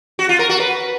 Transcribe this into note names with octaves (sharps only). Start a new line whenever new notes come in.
F#4
F4
A#4
F#4
B4